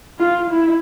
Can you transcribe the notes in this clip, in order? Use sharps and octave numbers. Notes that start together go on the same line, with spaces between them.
F4
E4